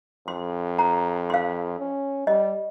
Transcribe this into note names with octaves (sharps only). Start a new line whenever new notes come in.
F2 C6
A#5
F5 C6
C#4
G3 D#5